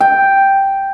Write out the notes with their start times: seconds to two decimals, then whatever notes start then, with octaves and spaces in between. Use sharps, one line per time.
0.01 G5